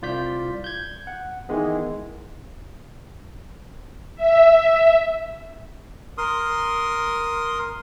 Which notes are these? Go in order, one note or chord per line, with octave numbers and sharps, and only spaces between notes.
C2 F4 D5 G6 B6
G6 G#6
F#5
D#3 E3 G#3 B3
E5
A#4 C6 D#6